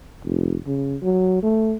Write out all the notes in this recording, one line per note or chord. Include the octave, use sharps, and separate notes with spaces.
F1
C#3
F#3
A3